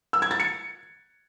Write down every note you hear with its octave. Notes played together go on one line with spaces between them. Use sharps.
E6
G#6
A6
C#7